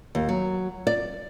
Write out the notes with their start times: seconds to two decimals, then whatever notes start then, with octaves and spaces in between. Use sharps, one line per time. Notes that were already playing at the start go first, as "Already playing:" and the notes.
0.15 D#2
0.29 F#3
0.87 D5